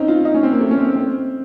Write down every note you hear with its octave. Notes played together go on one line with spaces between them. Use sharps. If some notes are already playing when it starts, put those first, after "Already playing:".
Already playing: C4 C#4 D#4
F4
D#4
C#4
C4
A#3
A3
C#4
C4
C4